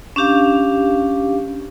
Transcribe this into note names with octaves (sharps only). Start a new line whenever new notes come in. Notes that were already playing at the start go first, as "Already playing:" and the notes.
C#4 D4 G4 F5